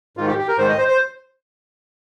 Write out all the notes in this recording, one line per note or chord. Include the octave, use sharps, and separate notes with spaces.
G#2 D#3 F4
G4
G4
A#4
G#2 D#3 C5
D#5
C5
C5